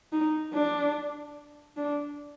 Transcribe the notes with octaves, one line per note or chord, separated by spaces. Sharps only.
D#4
D4
D4